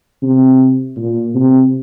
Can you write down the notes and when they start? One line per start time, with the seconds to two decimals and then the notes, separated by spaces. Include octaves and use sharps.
0.23 C3
0.97 A#2
1.35 C3